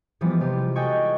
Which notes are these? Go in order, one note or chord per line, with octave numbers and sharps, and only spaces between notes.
E3 F3 G3 G#3 B3
C3 G3 F4 G4
F#4 A4 D#5 G5 G#5 C#6